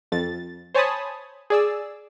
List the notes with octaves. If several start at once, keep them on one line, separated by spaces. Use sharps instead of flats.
F2 A6
C5 C#5 G#5 A5 B5 D#6
G#4 D5 E6